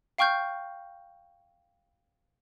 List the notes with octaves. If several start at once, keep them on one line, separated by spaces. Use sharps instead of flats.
F5 G5 C#6 F6 G6